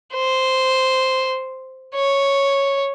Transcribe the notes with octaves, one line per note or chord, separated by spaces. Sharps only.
C5
C#5